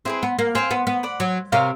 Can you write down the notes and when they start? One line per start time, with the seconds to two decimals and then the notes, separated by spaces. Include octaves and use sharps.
0.05 C4 E4 G#4 B4
0.23 B3
0.39 A#3
0.55 C4 C5 F5 G#5
0.71 B3
0.87 B3
1.03 D5 F#5 B5
1.20 F#3
1.52 C3 G4 A#4 C#5 F5